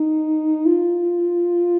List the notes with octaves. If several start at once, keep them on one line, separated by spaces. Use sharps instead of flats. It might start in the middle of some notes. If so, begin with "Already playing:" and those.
Already playing: D#4
F4